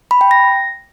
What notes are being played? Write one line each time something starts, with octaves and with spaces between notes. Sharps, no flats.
B5
G5
A#6